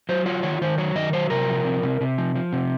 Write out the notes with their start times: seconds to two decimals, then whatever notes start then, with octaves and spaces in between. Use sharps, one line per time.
0.09 F#3 C5
0.26 F4 C#5
0.43 D#3 C#5
0.62 D#3 C5
0.78 F#3 C#5
0.95 D#3 D#5
1.13 F#3 C5
1.30 C3 A#4
1.48 F3
1.65 C3
1.83 C3
2.01 C3
2.18 F3
2.36 F3
2.53 C3